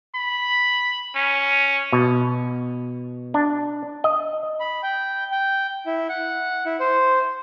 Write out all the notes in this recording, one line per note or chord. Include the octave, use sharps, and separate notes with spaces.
B5
C#4
B2
D4
D#5
B5
G5
G5
E4
F#5
E4
C5